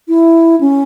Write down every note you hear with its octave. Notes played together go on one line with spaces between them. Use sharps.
E4
C#4